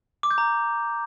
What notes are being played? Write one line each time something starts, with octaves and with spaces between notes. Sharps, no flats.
D6
G6
A#5